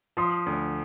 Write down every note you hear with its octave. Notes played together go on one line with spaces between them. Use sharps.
F3 C6 D#6
D2